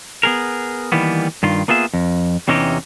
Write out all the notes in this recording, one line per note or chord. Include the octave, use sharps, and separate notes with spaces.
B3 G#4 A#4
D#3 E3 G3 A#3 B3
G2 D#3 F4
A#3 B3 F4 G#4 E5
F2
E2 C3 E3 C#4 D#4 G4